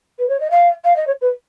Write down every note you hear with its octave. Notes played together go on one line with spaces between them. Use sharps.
B4
C#5
D#5
F5
F5
D#5
C#5
B4